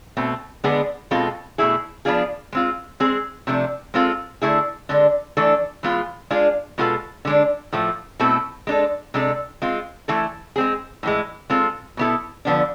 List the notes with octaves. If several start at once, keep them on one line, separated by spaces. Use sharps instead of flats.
B2 A3 C4
D3 G#3 B3 D4 G#4
B2 G#3 C4 F4 A4
B2 A3 E4 G#4
F3 B3 D4 F4 G#4
G#3 C4 F4
G#3 C4 G#4
C3 F3 A3 D4
G#3 C4 F4 A4
D3 A3 E4 G#4
D3 G#3 D4
E3 A3 D4 A4
E3 G#3 B3 F4
G#3 D4 F4 G#4
B2 G#3 B3 F4 A4
D3 G#3 D4
A2 F3 A3
B2 A3 C4 E4 A4
G#3 D4 A4
C3 G#3 D4 A4
G#3 C4 F4
E3 A3 E4 A4
G#3 C4 G#4
A2 E3 G#3
G#3 C4 F4 A4
B2 B3 E4 A4
D3 F3 B3 D4